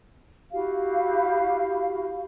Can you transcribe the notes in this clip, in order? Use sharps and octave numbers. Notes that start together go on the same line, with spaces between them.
E4 F#4 G4 F5